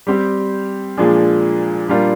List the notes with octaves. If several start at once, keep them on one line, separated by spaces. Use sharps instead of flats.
G3 C4 G4
A#2 F3 G#3 D4 G#4
A#2 G3 D4 F4 A#4